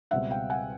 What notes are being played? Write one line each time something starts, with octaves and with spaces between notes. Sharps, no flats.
C#2 B2 G3 C4 E5 F#5
F5 G5
F#5 G#5